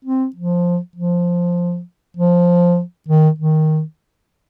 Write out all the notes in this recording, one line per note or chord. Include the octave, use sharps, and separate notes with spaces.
C4
F3
F3
F3
D#3
D#3